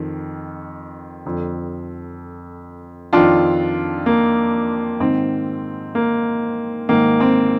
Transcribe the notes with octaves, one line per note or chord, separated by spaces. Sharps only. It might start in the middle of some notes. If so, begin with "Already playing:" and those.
Already playing: F2 D#3
F2 D3
F2 D#3 D4 F4
A#3
G#2 D#3 C4
A#3
G#2 D#3 A#3
C4